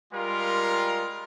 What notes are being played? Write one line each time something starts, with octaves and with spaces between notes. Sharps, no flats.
G3 G#3 F4 A#4